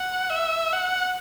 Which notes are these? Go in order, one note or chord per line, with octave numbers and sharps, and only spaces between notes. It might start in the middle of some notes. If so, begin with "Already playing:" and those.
Already playing: F#5
E5
F#5